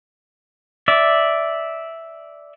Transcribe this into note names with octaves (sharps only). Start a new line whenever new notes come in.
D5 E5